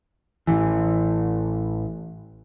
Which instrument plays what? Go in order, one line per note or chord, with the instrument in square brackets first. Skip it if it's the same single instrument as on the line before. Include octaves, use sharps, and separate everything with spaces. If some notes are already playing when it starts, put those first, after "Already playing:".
[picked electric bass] A1 E3